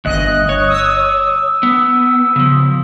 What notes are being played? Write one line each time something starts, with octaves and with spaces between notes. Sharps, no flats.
G1 D2 D#5 F#6
C#5
D#6 E6
B3
C#3 F3